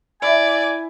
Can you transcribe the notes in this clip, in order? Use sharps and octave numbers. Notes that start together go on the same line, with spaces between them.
E4 D5 G#5